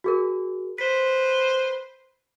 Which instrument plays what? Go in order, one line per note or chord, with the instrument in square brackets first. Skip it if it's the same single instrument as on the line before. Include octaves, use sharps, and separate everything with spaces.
[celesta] F#4 G#4 A#4
[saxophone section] B4 C5 [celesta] B6